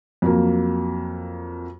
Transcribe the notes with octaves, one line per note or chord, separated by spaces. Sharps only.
F2 F#3 A#3